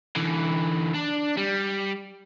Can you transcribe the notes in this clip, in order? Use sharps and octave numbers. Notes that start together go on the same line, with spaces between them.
D3 E3
D4
G3